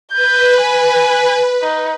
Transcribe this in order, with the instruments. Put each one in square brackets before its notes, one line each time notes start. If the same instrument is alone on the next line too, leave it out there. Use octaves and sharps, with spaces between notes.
[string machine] B4 [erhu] G6
[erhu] G#5
D#4